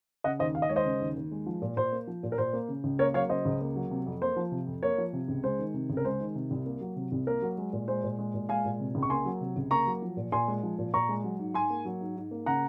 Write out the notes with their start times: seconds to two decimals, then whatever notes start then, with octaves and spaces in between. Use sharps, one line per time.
0.24 C#3 D#5 F#5
0.39 D#2 C5 D#5
0.55 D#2 F5
0.62 D#5
0.69 G#3 C#5
0.76 C5 D#5
0.85 C#3
1.00 D#2
1.16 D#2
1.31 G#3
1.46 F3
1.62 A#2
1.77 A#2 C5
1.92 A#3
2.07 F3
2.23 A#2
2.32 A#4
2.38 A#2 C5
2.53 A#3
2.68 C#3
2.84 C#2
2.99 A#3 A#4 C#5
3.14 F#3 C#5 F5
3.29 C#3 C5 D#5
3.45 C#2
3.61 A#3
3.76 F#3
3.91 C3
4.06 F2
4.21 A#3 C5
4.36 F3
4.52 C3
4.67 F2
4.83 A#3 A#4 C#5
4.98 F3
5.13 C3
5.28 C#2
5.43 G#3 C5
5.59 D#3
5.74 C3
5.90 C#2
5.97 A#4
6.04 G#3 C5
6.21 D#3
6.35 C3
6.51 C2
6.66 A#3
6.81 F#3
6.96 C3
7.12 C2
7.27 A#3 A#4
7.42 F#3
7.58 G#3
7.73 A#2
7.88 G#3 C5
8.04 A#2
8.19 G#3
8.34 A#2
8.49 G#3 F5 G#5
8.65 A#2
8.80 C3
8.95 C#2
9.03 C#6
9.10 A#3 G#5 C6
9.25 F#3
9.41 C3
9.56 C#2
9.71 A#3 A#5 C#6
9.87 F#3
10.02 F3
10.17 A#2
10.32 A#2 G#5 C6
10.48 G#3
10.63 F3
10.79 A#2
10.94 A#2 A#5 C#6
11.09 G#3
11.24 F#3
11.39 G#2
11.54 G#2 G#5 C6
11.70 A#3
11.85 F#3
12.01 G#2
12.16 G#2
12.31 A#3
12.46 C#3 F#5 A#5